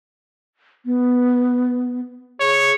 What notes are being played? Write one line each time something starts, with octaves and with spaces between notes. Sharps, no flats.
B3
G#4 C#5